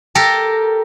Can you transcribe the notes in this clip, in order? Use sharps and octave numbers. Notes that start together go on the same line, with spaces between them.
G4 A4 A#4